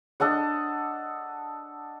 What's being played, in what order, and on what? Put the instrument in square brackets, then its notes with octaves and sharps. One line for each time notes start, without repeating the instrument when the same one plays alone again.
[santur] D4 A4 D#5 F#5